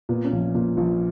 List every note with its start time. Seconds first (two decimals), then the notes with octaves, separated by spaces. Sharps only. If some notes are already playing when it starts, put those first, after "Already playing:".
0.09 A#2 B3
0.25 C#4
0.32 A#1
0.55 A#2
0.77 A#1